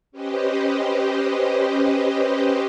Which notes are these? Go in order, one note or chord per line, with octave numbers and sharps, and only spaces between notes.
C#4 G4 B4 C5 D#5